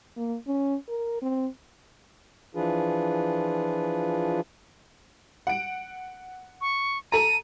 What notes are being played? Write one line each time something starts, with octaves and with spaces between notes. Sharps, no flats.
A#3
C#4
A#4
C4
E3 F3 D4 F4 G#4 B4
F#5 D7
C#6
A4 A#5 D#7